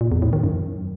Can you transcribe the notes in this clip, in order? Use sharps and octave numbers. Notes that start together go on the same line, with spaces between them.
A#2
E2
A2
D#3
F#2